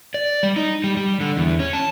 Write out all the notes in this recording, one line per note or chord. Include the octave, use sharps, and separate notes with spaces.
D5
G3
D#4
G3
G3
D3
E2
C#4
A5